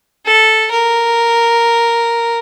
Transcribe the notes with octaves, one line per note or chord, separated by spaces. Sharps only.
A4
A#4